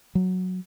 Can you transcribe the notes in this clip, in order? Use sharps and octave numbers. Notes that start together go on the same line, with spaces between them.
F#3